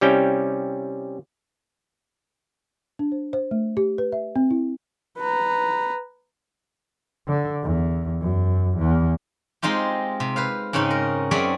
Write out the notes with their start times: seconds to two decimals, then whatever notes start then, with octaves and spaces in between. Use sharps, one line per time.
0.01 C3 G3 C#4 E4 G5
2.99 D4
3.12 C5
3.33 C5
3.51 A3
3.77 G4
3.98 B4
4.12 E5
4.36 C4
4.51 E4
5.18 B4 A#5
7.27 D3
7.63 E2
8.21 F#2
8.78 E2
9.62 G#3 C4 D#4 F4 G4
10.20 C3
10.36 B4 C5 F5
10.73 G#2 C#3 C4 C#4 D#4
10.91 A#4
11.31 F#2 C4 C#4 G#4 D5 E5